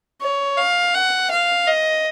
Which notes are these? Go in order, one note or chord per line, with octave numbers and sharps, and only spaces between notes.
C#5
F5
F#5
F5
D#5